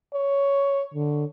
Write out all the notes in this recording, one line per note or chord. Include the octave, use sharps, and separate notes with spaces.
C#5
D3